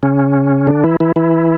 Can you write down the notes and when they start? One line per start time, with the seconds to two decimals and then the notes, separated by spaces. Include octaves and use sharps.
0.03 C#3 C#4
0.67 D3 D4
0.84 E3 E4
1.00 E3 E4
1.16 E3 E4